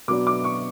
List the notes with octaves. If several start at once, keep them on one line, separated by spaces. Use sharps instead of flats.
B2 F#3 B3 D4 D6
D6
C#6